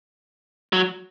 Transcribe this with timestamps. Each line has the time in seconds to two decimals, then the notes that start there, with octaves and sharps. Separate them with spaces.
0.73 F#3